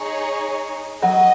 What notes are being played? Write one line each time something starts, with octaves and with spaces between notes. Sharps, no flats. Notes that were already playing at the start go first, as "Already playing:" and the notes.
Already playing: D#4 G#4 C#5
F#3 D#5